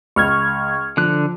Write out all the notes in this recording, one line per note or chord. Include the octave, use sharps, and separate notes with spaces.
C#2 C#6 F6 G#6
D3 F3 F#6